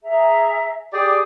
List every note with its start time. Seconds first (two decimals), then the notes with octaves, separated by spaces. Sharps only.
0.03 G#4 E5 A#5
0.93 G4 G#4 D5 G5